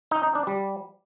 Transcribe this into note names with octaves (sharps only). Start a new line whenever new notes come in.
D#4
D#4
D4
G3